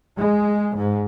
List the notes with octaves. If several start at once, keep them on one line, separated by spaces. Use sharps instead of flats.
G#3
G#2